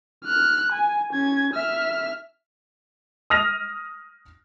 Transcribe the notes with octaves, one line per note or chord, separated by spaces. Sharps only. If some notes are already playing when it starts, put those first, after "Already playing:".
F6 F#6
G#5
C#4 G#6
E5 F6
D#6 F6 A#6 F7